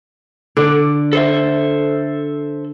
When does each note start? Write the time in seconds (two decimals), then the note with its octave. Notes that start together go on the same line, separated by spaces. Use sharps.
0.57 D3 D5
1.13 A4 C5 E5